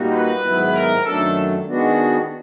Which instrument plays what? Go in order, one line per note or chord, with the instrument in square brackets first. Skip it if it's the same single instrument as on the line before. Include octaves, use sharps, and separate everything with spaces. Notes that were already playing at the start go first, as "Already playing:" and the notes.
Already playing: [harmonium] A#2 G3 A#3 D#4 F#4
[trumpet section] B4
[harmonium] G#2 D#3 F#3 B3 E4
[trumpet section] A#4
[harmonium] F#2 D#3 F#3 A3 D4 [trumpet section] A4
[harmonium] D#3 G#3 B3 D4 F#4